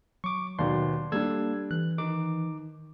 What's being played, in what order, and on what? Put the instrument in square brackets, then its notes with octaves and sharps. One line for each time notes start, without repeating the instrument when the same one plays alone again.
[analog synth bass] F#3 [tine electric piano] C#6 D6
[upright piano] D#2 B2 D#3 [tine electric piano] D5 C6
[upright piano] G3 D4 [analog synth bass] A#3 [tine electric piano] A4 E6 G#6
[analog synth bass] E3 [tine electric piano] F#6
[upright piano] D#3 [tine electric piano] D#4 D6